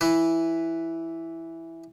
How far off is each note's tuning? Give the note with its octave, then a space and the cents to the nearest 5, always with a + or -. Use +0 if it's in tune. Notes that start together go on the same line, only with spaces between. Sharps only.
E3 +0 B4 +0